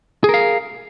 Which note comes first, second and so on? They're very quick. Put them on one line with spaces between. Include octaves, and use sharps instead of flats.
G#4 A#4 F5